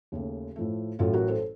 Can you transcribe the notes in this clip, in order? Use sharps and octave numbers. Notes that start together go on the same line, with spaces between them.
D#2 C#3 A3
A2 F3 A3
A1 A2 F#3 A3 F4 A4
F#4 A#4
A4 C5